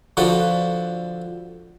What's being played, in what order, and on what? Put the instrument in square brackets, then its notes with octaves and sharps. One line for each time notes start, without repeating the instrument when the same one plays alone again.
[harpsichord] D3 F3 F#4 A4 B4